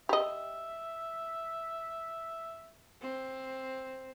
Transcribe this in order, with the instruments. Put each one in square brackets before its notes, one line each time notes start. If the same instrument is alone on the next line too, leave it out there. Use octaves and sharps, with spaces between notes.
[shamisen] G4 D#5 [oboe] E5
[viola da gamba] C4